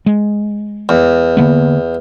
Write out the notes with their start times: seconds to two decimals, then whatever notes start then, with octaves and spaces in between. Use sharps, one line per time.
0.06 G#3
0.89 E2
1.37 D3 A#3 B3